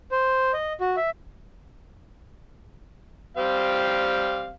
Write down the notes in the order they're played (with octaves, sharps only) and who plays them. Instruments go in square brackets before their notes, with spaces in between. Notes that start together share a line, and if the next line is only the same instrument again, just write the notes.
[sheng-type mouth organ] C5
D#5
F#4
E5
[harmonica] G3 C4 F5